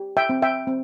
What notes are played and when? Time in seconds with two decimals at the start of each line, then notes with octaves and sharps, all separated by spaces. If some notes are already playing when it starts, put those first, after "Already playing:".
Already playing: G4
0.17 E5 G5
0.29 C4
0.42 E5 G5
0.67 C4